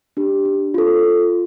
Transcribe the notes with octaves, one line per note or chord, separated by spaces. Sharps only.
D4 G4
D4
F4 A4
F4